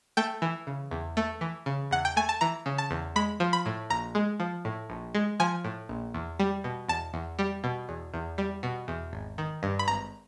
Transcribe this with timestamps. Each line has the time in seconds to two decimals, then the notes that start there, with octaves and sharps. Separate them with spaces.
0.17 A3 G5
0.42 E3
0.67 C#3
0.91 E2
1.17 A3
1.41 E3
1.66 C#3
1.91 E2 F#5
2.05 G5
2.16 A3 G#5
2.29 A5
2.41 E3 A#5
2.66 C#3
2.78 A5
2.91 E2
3.16 G#3 B5
3.40 F3
3.53 B5
3.66 A2
3.90 A#1 A#5
4.15 G#3
4.40 F3
4.65 A2
4.90 A#1
5.15 G#3
5.40 F3 G#5
5.65 A2
5.89 A#1
6.14 E2
6.40 G3
6.64 B2
6.89 E2 A5
7.14 E2
7.39 G3
7.64 B2
7.89 E2
8.14 E2
8.38 G3
8.63 B2
8.88 E2
9.13 G#1
9.38 D#3
9.63 G2
9.79 B5
9.88 G#1 A#5